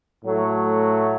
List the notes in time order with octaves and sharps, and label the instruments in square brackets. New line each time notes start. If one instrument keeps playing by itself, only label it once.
[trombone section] A2 F#3 A3